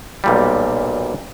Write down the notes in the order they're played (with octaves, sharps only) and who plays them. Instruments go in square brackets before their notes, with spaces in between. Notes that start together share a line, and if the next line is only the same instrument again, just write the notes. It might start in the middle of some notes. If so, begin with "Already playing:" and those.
[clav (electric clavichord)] B1 A#2 G3